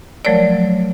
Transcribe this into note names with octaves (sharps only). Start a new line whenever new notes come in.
F3 F#3 A3 A#4 C#5 D5